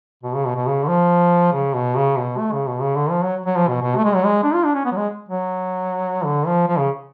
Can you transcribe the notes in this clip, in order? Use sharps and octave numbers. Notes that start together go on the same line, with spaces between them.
B2
C#3
B2
B2
C#3
D3
F3
C#3
B2
C#3
B2
A3
C#3
B2
C#3
D3
F3
F#3
F#3
F3
B2
B2
A3
G#3
F#3
G#3
D4
F4
D4
C#4
B3
F#3
G#3
F#3
D3
F3
F3
C#3